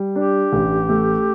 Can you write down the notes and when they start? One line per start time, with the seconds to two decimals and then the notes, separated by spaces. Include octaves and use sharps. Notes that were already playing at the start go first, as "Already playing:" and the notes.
Already playing: G3
0.15 D4 G4
0.53 A1
0.89 A3